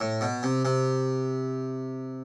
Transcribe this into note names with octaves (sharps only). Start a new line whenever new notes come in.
A2
B2
C3
C3